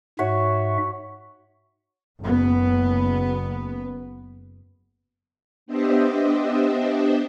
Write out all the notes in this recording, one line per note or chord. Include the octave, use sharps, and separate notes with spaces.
G#2 F#4 C#5 E5
F#1 B3
B3 D4 G4 C5 D#5 E5